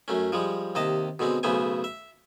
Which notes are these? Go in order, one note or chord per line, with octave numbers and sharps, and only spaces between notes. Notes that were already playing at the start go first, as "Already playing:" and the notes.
F#2 A3 C#4
F3 G3 G#3
D#2 C3 D#5 A5
B2 D3 G#3 C4
B1 C#3 A3 B3 C5 G#5
E5